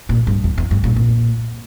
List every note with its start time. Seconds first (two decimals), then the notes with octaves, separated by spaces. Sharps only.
0.09 A#2
0.27 G2
0.44 E2
0.58 E2
0.71 G2
0.84 A#2
0.96 A#2